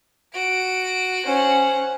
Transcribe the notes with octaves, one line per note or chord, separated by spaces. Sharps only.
F#4 D7
C#4 C5 F#5